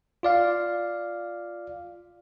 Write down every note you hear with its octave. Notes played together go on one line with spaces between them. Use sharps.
F4 D5 F5